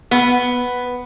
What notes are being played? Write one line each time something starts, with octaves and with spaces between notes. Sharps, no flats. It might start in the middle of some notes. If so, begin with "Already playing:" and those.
B3